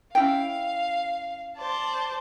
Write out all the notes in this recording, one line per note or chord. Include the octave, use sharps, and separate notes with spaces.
C#4 E4 F5 G5
C5 D5 A5